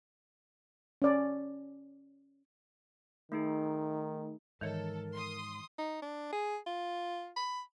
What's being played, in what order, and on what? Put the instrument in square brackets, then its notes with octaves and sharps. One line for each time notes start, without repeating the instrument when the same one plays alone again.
[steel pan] C#4 D5
[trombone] D#3 [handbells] A3 D#4 G#4
[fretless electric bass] G#2 [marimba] D#3 E3 C#5 [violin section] A4 [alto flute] A#4
[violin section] C6 D#6
[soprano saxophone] D#4
D4
G#4
F4
B5